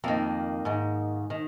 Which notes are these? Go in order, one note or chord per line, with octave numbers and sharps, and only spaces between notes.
F2 D#3 A#3
G#2 D#3
D#3